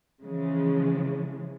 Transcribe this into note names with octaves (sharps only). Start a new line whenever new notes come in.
C#3 E3 F3 G#3